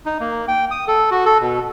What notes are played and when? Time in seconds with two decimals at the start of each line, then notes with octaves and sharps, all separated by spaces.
0.06 D#4
0.20 A#3
0.48 G5
0.71 D#6
0.88 A4
1.11 F#4
1.25 A4
1.41 B2